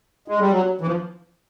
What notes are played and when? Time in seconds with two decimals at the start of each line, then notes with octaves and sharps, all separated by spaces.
0.28 G#3
0.40 G3
0.51 F#3
0.81 E3
0.87 F3